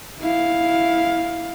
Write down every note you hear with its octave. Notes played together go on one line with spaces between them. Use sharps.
E4 F5